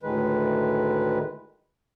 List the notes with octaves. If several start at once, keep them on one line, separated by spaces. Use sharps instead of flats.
D2 A2 D#3 G#3 B4